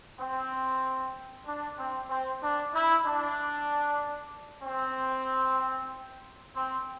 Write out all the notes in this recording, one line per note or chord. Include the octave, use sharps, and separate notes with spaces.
C4
D4
C4
C4
D4
E4
D4
C4
C4